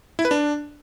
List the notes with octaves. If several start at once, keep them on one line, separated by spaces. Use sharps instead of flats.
E4
B4
D4